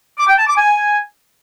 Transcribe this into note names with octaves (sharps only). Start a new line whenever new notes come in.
D6
G5
A5
D6
G#5